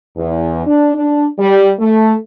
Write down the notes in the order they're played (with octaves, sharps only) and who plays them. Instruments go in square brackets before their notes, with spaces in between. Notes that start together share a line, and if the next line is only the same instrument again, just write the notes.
[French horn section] E2
D4
D4
G3
A3